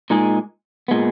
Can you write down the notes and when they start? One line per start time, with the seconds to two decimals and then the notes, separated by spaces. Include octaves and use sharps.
0.10 A#2 G#3 D#4 G#4
0.88 A#2 G#3 B3